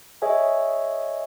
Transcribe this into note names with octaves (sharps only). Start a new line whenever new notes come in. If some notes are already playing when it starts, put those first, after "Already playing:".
G#4 C#5 D#5 E5 G#5